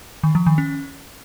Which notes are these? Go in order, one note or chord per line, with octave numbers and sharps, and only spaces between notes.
D#3
F3
D#3
C#4